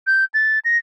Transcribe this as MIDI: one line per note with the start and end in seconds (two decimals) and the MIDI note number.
0.07 0.25 91
0.34 0.59 93
0.65 0.78 94